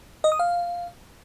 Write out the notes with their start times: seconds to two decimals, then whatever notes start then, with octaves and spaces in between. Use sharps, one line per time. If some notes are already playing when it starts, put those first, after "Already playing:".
0.24 D#5
0.32 D#6
0.39 F5